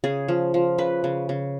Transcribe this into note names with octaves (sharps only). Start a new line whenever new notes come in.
C#3 G#4
F3
F3
C#3 B4
C#3
C#3